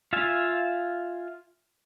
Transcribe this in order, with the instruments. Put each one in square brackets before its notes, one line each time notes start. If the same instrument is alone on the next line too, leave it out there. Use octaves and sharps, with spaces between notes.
[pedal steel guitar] F4 E5 F5 G#5